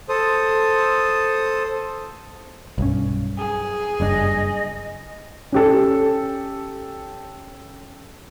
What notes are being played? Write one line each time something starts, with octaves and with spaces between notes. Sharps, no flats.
A4 C5 D#6
B1 G2 C#4
G#4
F#1 G2 D4 D#5
C#4 G4 A4